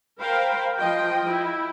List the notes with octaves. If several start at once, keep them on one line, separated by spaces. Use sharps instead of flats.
A#4 C5 F5 G5 B5
F3 D#5 G5
E4